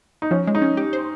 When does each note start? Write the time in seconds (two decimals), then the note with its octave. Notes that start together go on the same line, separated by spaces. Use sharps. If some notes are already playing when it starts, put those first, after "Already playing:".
0.22 D#4
0.31 F3 C#4
0.47 G#3
0.55 D#4
0.62 C#4
0.77 G4
0.93 C5